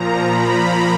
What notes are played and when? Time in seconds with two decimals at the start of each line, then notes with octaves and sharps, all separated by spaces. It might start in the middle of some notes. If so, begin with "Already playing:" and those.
Already playing: A#2 F3 A#5
0.26 B5